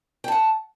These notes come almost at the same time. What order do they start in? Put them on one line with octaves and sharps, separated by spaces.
G5 A5 F#5